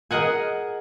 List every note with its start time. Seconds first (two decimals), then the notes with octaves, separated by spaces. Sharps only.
0.11 G#4 A#4 D#5 F#5 G#5